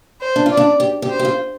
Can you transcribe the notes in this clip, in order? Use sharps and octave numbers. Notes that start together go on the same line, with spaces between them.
C5
D4
F4 D5
D4
G4
G4
C5
G4
F4